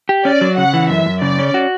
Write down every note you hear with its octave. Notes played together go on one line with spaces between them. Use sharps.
G4
C#4 D5
F#3
C#3 F#5
E3
F#2 E5
F#2
C#3 D5
C#4
F#4